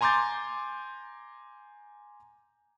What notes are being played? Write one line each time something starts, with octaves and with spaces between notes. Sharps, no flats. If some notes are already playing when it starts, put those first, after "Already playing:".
G#5 A#5 C6 D6 G6 A6